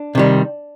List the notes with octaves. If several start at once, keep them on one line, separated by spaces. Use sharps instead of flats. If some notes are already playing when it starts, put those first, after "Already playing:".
Already playing: D4
C3 D#3 G3